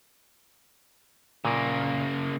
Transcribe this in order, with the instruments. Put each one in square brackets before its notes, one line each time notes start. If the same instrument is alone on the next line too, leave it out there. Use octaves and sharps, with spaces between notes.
[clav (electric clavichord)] A#2 [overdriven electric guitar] C#3 A#3